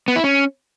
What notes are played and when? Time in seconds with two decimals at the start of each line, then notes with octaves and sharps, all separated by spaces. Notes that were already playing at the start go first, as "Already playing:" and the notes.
0.08 B3
0.16 E4
0.24 C#4